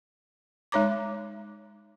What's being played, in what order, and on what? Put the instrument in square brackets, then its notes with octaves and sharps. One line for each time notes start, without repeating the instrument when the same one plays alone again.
[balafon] G#3 D#4 C#5 A#5 D6